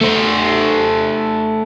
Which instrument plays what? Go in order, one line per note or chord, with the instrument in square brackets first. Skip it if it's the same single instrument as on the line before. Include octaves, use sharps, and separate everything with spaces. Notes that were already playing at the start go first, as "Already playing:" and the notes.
[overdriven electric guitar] A3 C5